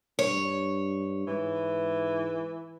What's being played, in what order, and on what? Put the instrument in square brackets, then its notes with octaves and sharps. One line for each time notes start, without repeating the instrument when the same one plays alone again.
[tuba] G2 [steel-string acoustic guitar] C#5
[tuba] G#2 [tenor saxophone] E3